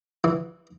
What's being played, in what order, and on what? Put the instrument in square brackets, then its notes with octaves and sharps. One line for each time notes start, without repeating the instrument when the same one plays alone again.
[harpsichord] E3